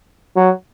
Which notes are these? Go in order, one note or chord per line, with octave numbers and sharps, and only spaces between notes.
F#3